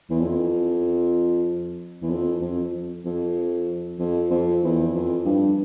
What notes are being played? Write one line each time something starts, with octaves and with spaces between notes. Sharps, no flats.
E2
F2
E2
F2
F2
F2
F2
F2
E2
F2
G2